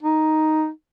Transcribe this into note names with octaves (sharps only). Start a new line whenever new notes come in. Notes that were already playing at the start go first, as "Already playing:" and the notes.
D#4